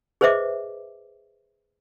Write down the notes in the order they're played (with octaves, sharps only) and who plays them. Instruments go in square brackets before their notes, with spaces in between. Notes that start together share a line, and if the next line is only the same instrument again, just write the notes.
[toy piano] G#4 B4 C5 D#5 E5 D6